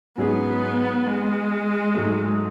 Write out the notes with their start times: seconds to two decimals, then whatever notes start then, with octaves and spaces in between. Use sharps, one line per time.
0.17 G#2 F#3 B3 C#4 G#4
1.07 G#3
1.95 G#2 F#3 A3